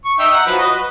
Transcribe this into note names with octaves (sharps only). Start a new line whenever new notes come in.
C#6
D#4 E5 G5
F#5 A#5
F3 F#3 B4
F#4 B4 D#5
B4